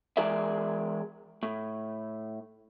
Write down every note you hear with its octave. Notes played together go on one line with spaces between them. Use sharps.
E3 G#3 G#4 A#4 D5 E5
A2